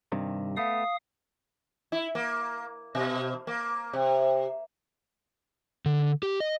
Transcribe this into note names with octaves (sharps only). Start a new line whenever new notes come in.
G2 C3 D#3
A3 B3 F5 D#6
E4
A#3
B2
A#3
C3
D3
G4
D#5